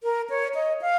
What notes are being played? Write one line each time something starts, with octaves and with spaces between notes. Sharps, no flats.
A#4
C#5
D#5
F5